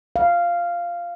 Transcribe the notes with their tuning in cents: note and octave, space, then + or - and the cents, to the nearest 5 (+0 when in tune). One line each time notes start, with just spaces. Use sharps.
F5 -10